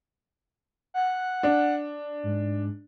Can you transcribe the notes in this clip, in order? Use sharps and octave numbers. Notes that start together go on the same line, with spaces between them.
F#5
D4
G#2